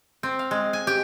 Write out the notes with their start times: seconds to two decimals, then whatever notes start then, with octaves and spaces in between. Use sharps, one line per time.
0.23 C4
0.39 F5
0.51 G#3
0.73 G#5
0.87 G4